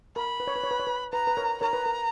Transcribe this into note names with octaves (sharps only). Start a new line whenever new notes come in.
A#4 B5
B4
C#5
B4
C#5
B4
C#5
B4
B4 A#5
B4
A#4 C#5
A#4 C#5 A#5
B4
A#4